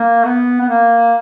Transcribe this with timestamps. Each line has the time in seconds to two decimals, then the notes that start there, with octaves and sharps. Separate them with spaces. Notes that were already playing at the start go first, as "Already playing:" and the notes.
Already playing: A#3
0.25 B3
0.61 B3
0.69 A#3